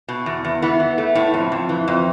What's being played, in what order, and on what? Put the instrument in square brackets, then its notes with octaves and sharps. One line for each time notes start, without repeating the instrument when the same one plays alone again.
[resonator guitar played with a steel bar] B2
E2
E2
E3 B3
E3
A3
A2
F2
F2
E3
F2